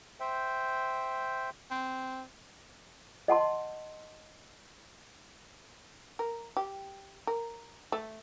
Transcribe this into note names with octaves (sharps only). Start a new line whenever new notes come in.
C5 E5 G5
C4
D#5 F#5 A5 C6
A#4
G4
A#4
A3